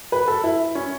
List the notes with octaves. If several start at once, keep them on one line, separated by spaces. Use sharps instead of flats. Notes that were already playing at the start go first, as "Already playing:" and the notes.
B4
A4
E4
C#4